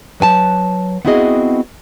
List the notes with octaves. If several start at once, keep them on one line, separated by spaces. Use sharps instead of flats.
F#3 B4 G#5 A5
B3 C4 E4 F#4 G#4 D#5